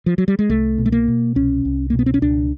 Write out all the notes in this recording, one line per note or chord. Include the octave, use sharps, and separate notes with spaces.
F3
F#3
G3
G#3
C2 A3
B2
A3
A#3
B2
C2 C#4
C2
A#3
B2
B3
C4
C#4
C#2 D4